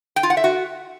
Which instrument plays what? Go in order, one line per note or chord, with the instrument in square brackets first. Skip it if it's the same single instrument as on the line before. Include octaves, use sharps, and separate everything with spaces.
[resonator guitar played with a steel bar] G5
F4
F#5
E5
F#4